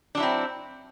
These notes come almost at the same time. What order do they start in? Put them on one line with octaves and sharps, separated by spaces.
D4 F#3 E4 C4